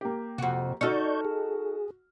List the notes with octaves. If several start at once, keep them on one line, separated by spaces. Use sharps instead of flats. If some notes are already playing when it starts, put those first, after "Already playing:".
A#3 G4
F2 C3 F#4
D#4 F#4 A4 D5 C#6 F6 G6 C#7
G#4